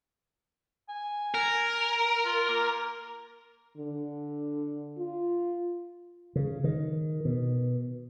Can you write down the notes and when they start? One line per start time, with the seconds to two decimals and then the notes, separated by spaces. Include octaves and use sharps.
0.89 G#5
1.34 A#4
2.25 F4
2.48 A#3
3.77 D3
4.98 F4
6.36 C#3
6.64 D#3
7.25 B2